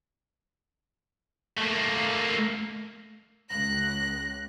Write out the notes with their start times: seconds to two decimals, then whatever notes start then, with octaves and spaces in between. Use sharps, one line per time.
1.57 A3 A#3
3.50 C#2 F#6 A#6